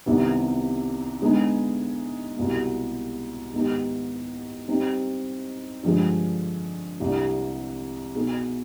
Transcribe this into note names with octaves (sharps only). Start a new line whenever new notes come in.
C2 C3 D#3 B3
D3 G#3 B3 D#4
C2 B2 G3 B3
G#2 D#3 B3 D#4 G4
G3 C4 D#4
G2 D3 F3 G#3
C2 C3 G3 D4
B2 B3 D#4 G#4